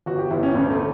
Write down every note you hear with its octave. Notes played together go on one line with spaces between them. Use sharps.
G1 F#4
G4
G1 E4
C#4
D2 C#4
A3